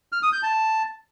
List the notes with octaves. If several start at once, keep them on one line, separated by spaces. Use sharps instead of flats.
F6
D#6
G6
A5